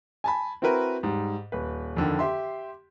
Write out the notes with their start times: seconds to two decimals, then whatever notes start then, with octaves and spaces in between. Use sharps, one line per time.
0.24 G#5 A5 B5
0.62 C4 E4 F#4 A#4 B4
1.03 G#2 G3
1.52 D#1 B4
1.97 F2 D3 D#3
2.19 G4 E5 C6